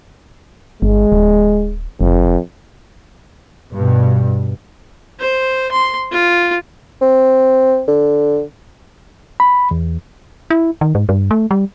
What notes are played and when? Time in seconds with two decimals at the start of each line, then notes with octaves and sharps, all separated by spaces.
0.82 G1 G#3
1.12 D1
2.01 F#1 F2
3.73 G2 B2
5.20 C5
5.72 C6
6.12 F4
7.01 C4
7.88 D3
9.40 B5
9.71 E2
10.50 E4
10.81 D#3
10.95 G#2
11.09 G2
11.31 A3
11.51 G3